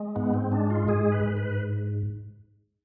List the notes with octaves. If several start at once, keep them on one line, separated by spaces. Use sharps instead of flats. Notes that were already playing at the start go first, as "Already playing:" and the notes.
Already playing: G#3
G#2 B3
C4
G#3 D4
F4
G#2 G#4
B4
G#2
B4